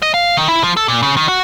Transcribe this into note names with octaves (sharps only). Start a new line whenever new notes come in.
D#5
F5
D#3
E4
F3
A4
A#2
C#3
D#3
F#4